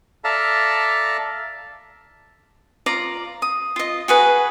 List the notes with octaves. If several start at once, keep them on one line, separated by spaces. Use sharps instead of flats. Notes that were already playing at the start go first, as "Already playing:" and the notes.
A4 D5 E5 F5 A5 A#5
F4 D5 A#5
D#6
F4 D#5
F#4 G#4 B4